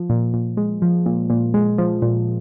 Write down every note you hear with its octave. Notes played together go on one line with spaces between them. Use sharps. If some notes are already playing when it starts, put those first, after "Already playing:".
Already playing: F3
A#2
A#2
G#3
F3
A#2
A#2
G#3
F3
A#2